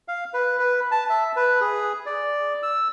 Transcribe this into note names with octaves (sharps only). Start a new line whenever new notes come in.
F5
B4
B4
A5
E5
B4
G#4
D5
E6